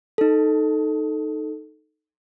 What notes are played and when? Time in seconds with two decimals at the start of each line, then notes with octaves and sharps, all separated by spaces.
0.18 D#4 A4